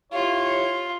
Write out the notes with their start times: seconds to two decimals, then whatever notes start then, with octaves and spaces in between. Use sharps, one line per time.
0.13 E4 F4 G4 C#5